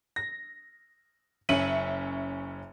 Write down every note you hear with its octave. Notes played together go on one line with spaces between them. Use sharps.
A#6
F#1 C#4 E5 C#7 D#7 F#7